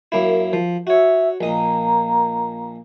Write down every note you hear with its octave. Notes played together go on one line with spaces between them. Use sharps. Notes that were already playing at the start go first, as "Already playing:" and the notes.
F#2 A#3 E4
F3
F#4 C#5 E5
A#1 A#3 D#5